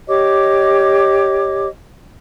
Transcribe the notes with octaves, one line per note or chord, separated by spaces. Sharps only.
G4 C#5 D#5 D6